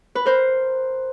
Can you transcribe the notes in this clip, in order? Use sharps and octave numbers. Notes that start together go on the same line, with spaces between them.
B4
A#4 C5